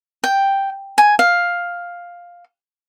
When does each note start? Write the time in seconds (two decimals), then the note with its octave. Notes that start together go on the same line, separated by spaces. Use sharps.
0.24 G5
0.98 G#5
1.19 F5